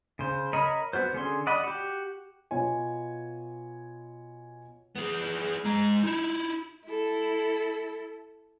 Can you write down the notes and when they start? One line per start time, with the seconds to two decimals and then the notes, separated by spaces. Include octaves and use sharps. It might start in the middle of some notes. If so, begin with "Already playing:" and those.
0.19 C#3 C5
0.53 A#4 C#5 D#5 A#5 B5
0.93 B3 F#4 C5
1.13 D3 C#4 G#4 C6
1.47 D5 D#5 F#5 B5
1.63 F#4 G4
2.51 B2 F4 C#5 G#5
4.96 B3 G#4
5.64 G#3 A#5
6.03 D#4 E4
6.86 E4 A4